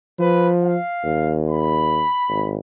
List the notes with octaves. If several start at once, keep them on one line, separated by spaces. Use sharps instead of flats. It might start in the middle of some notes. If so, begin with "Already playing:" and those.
F3 B4
F5
D#2
B5
G#1